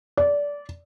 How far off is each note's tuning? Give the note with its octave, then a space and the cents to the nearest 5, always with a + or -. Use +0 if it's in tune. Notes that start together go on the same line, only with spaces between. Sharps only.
D5 -20